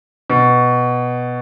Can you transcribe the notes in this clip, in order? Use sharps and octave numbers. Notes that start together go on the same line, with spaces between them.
B2